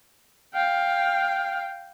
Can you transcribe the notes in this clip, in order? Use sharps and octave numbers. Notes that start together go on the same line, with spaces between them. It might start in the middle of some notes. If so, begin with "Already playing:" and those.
F5 G5